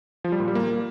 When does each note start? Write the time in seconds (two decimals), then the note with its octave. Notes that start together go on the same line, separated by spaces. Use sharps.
0.24 F3
0.32 G3
0.40 A#2
0.48 G3
0.55 A#3